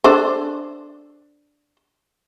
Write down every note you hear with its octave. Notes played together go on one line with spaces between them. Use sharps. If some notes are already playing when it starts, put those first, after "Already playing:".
D4 A4 C5